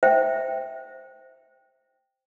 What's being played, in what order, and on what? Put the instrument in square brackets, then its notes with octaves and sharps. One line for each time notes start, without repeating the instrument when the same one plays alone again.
[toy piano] C5 E5 G5